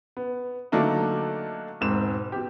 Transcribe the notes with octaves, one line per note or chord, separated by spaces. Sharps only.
B3
D3 F#3 A3 A#3 D4 D#4
E1 G#2 C4 E7
B2 G4